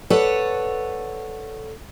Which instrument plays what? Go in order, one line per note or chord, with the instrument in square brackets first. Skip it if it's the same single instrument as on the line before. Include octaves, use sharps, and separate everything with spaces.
[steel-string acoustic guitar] A4 B4 C#5 D5 F#5